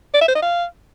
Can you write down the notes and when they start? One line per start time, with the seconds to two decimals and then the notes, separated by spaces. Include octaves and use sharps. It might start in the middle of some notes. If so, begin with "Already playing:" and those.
0.14 D5
0.21 E5
0.28 C5
0.35 D#5
0.42 F5